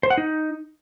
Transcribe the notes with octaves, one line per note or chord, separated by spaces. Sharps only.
C5
F#5
D#4